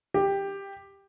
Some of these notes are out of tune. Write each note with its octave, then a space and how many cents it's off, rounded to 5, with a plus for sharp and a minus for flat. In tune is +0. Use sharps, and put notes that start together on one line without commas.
G4 +10